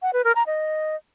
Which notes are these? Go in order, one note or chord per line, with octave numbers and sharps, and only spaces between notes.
F#5
B4
A#4
A#5
D#5